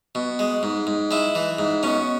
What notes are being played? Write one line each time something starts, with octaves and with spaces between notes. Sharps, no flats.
B2
G#3
G#2
G#2
G#3 E4
E3
G#2
B2 C#4